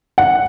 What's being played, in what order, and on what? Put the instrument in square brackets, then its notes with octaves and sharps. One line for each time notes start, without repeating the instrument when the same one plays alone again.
[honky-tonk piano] F#5